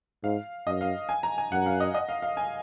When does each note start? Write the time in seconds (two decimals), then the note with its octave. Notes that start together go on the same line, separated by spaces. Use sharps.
0.24 G#2 F5
0.66 F#2 D#5
0.81 F5
1.09 G#5
1.23 A#5
1.38 G#5
1.52 F#2 F#5
1.66 F5
1.80 D#5
1.94 D#5
2.09 F5
2.22 F5
2.37 G#5